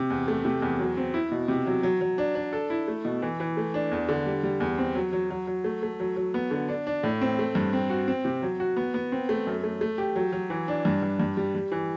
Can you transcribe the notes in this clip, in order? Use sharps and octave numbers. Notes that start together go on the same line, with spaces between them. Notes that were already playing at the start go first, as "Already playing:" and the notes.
Already playing: C3
E2
A3
C3
E2
F#3
C4
E4
B2
C3
F#3
F#3
F#3
D4
D4
A4
E4
A3
B2
E3
E3
A3
D4
E2
D3
G3
G3
E2
C4
F#3
F#3
F#3
F#3
A3
A3
F#3
F#3
B3
D3
D4
D4
A2
C4
A3
G2
C4
F#4
C4
C3
F#3
F#4
B3
B3
C4
A3
F#2
A3
A3
G4
F#3
F#3
E3
D4
G2
G2
G2
G3
G3
E3